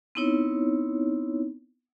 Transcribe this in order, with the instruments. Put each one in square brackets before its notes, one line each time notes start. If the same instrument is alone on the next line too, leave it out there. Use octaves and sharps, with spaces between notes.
[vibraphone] B3 C4 D#4 E4 C#5